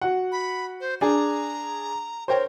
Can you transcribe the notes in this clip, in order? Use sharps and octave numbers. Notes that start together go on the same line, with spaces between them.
F#4 F#5
B5
C5
D4 G#4 A#5
A#4 C5 C#5 G5